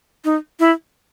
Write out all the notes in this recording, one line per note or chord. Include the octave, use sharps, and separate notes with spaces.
D#4
E4